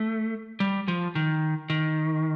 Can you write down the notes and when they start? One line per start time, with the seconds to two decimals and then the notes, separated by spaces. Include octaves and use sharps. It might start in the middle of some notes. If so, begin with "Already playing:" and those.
Already playing: A3
0.60 G3
0.88 F3
1.15 D#3
1.70 D#3